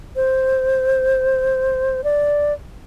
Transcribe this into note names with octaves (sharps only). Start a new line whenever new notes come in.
C5
D5